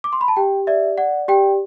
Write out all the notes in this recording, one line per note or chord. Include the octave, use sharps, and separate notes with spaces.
D6
C6
B5
A5
G4 G5
D5 E5
D5 F#5
G4 G5